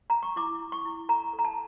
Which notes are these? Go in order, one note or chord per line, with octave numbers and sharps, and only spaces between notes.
A#5
C#6
E4 D6
E4
C#6
E4
A4 A#5
A4
A#5
A5